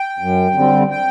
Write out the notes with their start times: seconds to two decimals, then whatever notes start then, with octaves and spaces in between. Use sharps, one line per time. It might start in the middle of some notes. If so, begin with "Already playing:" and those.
Already playing: G5
0.19 F#2
0.54 D3 G3 C4
0.91 G5